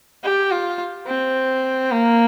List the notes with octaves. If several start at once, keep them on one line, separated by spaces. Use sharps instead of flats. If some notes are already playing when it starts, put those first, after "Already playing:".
G4
F4
C4
A#3